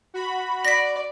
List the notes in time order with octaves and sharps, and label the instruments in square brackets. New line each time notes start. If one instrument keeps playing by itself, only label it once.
[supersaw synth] F#4 B5
[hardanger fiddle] D5 [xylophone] A#6 B6